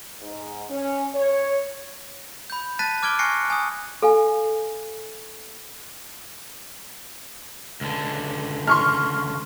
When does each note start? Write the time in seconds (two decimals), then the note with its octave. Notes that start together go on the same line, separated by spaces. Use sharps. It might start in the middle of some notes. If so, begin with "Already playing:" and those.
0.21 G#2
0.70 C#4
1.14 C#5
2.50 B5 G6
2.79 A5 F#6 A6 B6 D#7
3.03 D6 F6 G#6 D7 G7
3.19 G#5 C#6 F#6 A#6 C7 C#7
3.50 G#5 D#6
4.02 A4 F5 G#5
7.81 C#2 D3
8.67 C6 C#6 F6